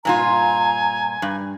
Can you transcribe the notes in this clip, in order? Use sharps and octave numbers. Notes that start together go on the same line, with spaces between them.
G2 A#2 F4 G#5 A#5
G2